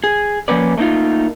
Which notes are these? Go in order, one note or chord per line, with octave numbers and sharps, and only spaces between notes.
G#4
F3 A#3 C#4 B4 D5
A3 A#3 D#4 F4